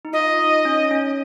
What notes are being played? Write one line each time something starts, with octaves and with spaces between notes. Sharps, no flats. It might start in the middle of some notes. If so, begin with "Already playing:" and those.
D#4
F4 D#5
D#4
C#4
C#4